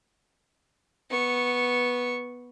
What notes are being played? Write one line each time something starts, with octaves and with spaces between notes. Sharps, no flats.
B3 C#6